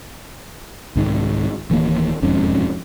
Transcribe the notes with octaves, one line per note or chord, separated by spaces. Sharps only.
C2 G#2 D#3
D1 D#3 E3 A#3
E1 F2 G#2 C#4